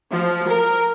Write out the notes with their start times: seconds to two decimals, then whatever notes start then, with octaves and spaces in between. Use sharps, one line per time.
0.12 F3
0.48 A#4